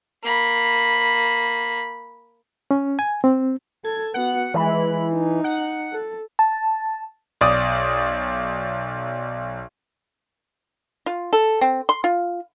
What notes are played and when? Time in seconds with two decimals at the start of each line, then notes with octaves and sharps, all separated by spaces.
0.23 A#3 B5
2.71 C#4
2.99 G#5
3.24 C4
3.85 A4 G#6
4.14 B3 F#4 F#5
4.54 E3 G#3 B5
5.13 D#4
5.44 F#5
5.93 A4
6.39 A5
7.41 B1 D5 D#6
11.06 F4
11.33 A4
11.61 C4
11.89 C6
12.04 F4